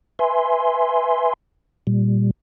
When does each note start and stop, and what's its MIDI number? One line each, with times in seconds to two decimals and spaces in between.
0.19 1.33 71
0.19 1.33 76
0.19 1.33 80
0.19 1.33 84
1.87 2.31 46
1.87 2.31 55